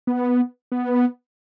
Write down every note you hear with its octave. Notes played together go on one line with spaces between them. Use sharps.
B3
B3